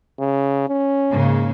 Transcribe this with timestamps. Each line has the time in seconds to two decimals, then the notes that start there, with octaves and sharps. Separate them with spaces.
0.20 C#3
0.68 C#4
1.10 G#2 C#3 A#3